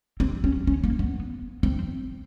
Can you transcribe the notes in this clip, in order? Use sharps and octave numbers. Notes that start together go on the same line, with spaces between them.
C4
C#4
C#4
A#3
B3
C4